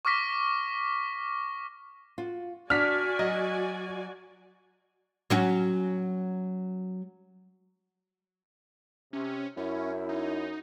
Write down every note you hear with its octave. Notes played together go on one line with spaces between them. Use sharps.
C#6 D6 F6 A#6 B6
F4 F#4
D4 F#4 D5 F#5 G#5 F6 B6
F#3 D#5
F#3 C#4 F#4
C3 C#4
F#2 C#4 E4
D#4